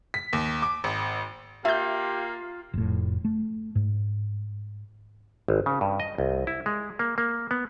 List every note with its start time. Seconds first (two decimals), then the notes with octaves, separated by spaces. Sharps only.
0.14 B6
0.33 D#2
0.62 D6
0.84 G#1
1.65 A#3 F4 G4 E5 G6
2.74 F1 A2
3.25 A3
3.75 G#2
5.48 G#1
5.66 C#3
5.81 G2
6.00 D#5
6.18 C2
6.47 E4
6.66 G#3
6.99 A#3
7.18 A#3
7.51 B3